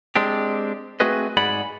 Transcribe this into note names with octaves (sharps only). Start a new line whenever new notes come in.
G#3 C4 D4 G4
A3 C4 F#4 G#4 B4 D#5
G#2 G#4 D5 F#5 B5